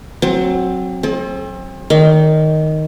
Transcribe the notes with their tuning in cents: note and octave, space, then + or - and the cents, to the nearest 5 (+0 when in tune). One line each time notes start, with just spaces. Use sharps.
F#3 +0 C4 +20
C4 +35 A4 -40
D#3 +0 D5 -45